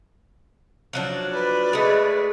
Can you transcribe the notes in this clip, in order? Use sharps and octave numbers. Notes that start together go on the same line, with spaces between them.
F3 F#3 D4
B4 D5
G#3 A3